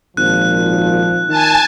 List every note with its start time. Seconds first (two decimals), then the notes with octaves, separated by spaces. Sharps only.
0.17 G#1 A#2 F3 F#6
1.29 D#3 G#5 A5